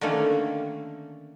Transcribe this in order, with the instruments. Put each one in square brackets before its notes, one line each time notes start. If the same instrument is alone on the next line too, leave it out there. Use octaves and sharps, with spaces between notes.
[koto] D3 D#3 A3 A#3 C#4